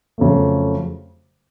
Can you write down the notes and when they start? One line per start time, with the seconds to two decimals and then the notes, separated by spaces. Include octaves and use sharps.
0.18 F2 C#3 F#3 A3